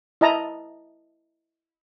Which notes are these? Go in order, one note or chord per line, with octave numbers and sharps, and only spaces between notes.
E4 D#5 A5 A#5